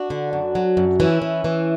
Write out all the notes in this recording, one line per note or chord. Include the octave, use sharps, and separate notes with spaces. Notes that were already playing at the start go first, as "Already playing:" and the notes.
Already playing: D4 F#4
D3
F#2
F#3
F#2
E3 C#4 E4
E3
E3